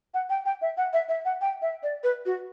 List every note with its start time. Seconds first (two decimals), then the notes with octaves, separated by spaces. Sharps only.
0.14 F#5
0.30 G5
0.45 G5
0.62 E5
0.77 F#5
0.93 E5
1.09 E5
1.25 F#5
1.41 G5
1.62 E5
1.83 D5
2.04 B4
2.26 F#4